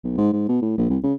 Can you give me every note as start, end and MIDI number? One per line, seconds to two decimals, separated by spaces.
0.04 0.16 35
0.18 0.29 44
0.33 0.44 44
0.49 0.57 47
0.62 0.77 45
0.78 0.85 34
0.90 0.98 36
1.03 1.14 49